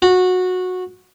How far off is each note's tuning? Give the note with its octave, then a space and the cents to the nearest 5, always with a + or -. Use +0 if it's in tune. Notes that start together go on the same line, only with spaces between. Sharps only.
F#4 -15